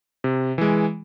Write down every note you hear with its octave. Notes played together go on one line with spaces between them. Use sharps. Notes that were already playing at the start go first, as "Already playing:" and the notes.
C3
E3 G#3